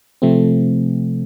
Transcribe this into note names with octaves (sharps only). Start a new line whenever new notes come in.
C3 F3 A3 C4